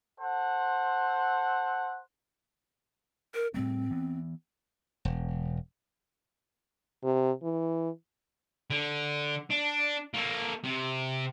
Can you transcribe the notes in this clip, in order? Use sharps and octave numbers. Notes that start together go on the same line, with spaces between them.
A4 C5 F#5
A#4
A2 G3 A3 C4
E3 B3
E1
C3
E3
D3
D4
A#3 A4
C3